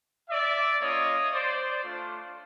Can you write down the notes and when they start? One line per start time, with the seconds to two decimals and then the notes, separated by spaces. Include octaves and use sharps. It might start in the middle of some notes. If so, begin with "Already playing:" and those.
0.29 D5 E5
0.80 A#3 C#4 F4 C#5 D#5
1.32 C5 D5
1.83 A3 D4 F4